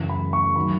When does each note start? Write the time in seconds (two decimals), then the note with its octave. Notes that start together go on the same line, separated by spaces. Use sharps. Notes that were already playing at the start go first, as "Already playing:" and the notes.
Already playing: F#2 C#3 E3
0.09 B5
0.33 C#6
0.56 D#3 F#3 B5